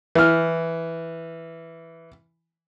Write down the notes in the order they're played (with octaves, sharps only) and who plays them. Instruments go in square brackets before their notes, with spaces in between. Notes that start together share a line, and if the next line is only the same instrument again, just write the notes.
[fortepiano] E3 F6